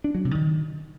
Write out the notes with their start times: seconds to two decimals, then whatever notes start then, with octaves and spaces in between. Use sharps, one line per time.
0.04 D4
0.15 F#3
0.25 C3
0.35 D#3